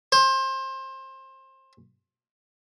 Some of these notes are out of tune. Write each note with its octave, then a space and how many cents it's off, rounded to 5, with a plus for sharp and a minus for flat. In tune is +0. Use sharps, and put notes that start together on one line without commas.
C5 +25